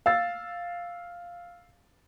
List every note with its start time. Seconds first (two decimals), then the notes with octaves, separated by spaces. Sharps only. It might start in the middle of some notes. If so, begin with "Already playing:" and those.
0.06 F5 E6 A6